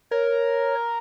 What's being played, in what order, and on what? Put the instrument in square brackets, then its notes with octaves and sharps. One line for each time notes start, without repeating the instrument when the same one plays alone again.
[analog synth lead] A#4 [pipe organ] C#5